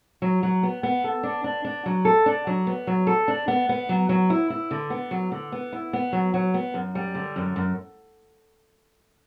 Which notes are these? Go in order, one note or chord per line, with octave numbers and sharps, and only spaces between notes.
F#3
F#3
B3
B3
A4
D4
D4
D4
F#3
A4
D4
F#3
B3
F#3
A4
D4
B3
B3
F#3
F#3
E4
E4
D3
B3
F#3
D3
B3
E4
B3
F#3
F#3
B3
F#2
G3
D3
F#2
F#2